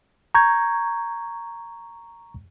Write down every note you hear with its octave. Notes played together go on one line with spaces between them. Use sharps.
A#5 C#6 G6 G#6